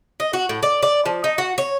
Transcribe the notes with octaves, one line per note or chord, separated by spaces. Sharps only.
D#5
F#4
A2
D5
D5
F3
D#4
F#4
C#5